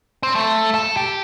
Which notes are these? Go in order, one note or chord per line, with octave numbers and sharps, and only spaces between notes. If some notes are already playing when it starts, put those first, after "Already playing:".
C4
A3
A4
G4